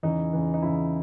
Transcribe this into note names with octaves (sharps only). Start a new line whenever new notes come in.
E2 C#3 E3 D#4
E2 C#3 E3
D#4
E2 C#3 E3 E4